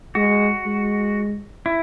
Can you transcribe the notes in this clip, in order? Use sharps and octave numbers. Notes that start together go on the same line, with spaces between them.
G#3 F#4
G#3
E4